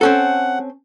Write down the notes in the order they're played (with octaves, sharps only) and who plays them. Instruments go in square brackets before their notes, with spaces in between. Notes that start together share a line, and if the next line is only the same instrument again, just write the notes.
[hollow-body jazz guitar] C4 C#4 A4 [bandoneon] F#5